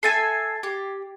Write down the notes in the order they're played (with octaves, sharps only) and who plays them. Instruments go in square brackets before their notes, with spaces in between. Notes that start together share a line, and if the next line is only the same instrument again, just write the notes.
[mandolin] A4 E5 G#5 [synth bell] G#6 A6 C7
[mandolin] G4